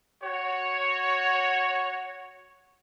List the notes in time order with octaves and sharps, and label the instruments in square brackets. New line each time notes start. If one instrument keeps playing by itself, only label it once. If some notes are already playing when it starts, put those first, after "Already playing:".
[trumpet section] F#4 C#5